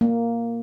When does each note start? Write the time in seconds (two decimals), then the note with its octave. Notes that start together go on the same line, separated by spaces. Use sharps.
0.01 A#3